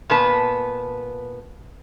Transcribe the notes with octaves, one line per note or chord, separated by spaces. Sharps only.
A#2 B3 B4 A5